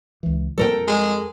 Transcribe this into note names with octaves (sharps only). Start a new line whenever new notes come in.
C#2 E3
F2 G3 A4 A#4 G5
G#3